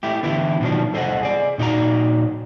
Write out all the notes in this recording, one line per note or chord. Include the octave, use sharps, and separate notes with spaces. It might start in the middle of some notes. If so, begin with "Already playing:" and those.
A3 E4 G4
D3 E3 B3 E4 G4
B2 D#3 F3 F#3 D4
C2 A4 C5 D5 D#5 F#5
G#4 D5
A#2 D#4 F#4 D5 A#5